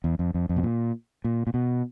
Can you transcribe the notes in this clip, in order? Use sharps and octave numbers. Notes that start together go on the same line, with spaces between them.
E2
F2
F2
F2
B2
A#2
A#2
A#2
B2